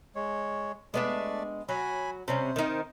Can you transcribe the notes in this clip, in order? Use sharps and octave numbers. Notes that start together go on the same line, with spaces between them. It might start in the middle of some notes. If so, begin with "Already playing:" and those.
G#3 C#5
G#3 A3 B3 D4 D5
F#3 G#5 B5
C3 G3 C#4 C5
D#3 D#4